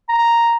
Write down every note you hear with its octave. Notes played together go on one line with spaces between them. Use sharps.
A#5